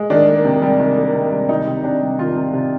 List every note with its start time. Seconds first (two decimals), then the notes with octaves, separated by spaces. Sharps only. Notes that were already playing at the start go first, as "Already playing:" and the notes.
Already playing: G#3
0.10 D#3 D4
0.28 A#3
0.45 C3
0.62 G3
0.80 D#3
0.97 A#3
1.14 C3
1.32 G3
1.49 D#3 D#4
1.67 C3
1.84 C3 D4
2.01 G3
2.19 D#3 F4
2.36 C3
2.53 C3